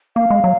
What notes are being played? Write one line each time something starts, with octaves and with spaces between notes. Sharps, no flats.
A#3 F5
G#3
F#3